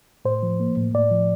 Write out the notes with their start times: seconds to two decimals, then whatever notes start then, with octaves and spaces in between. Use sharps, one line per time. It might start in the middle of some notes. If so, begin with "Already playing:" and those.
0.25 A2 C5
0.43 F3
0.60 A#3
0.77 A2
0.94 A2 D5
1.11 F3